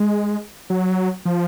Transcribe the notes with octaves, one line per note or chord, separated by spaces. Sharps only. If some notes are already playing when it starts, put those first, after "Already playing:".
Already playing: G#3
F#3
F3